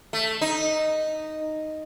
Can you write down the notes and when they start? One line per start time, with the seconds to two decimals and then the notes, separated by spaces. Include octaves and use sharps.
0.13 A3
0.41 D#4